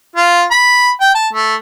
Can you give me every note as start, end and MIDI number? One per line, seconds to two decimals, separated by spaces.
0.16 0.43 65
0.51 0.89 83
1.01 1.12 79
1.15 1.28 81
1.33 1.55 57